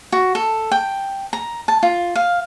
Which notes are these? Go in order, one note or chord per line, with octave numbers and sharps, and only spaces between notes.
F#4
A4
G5
A#5
A5
F4
F5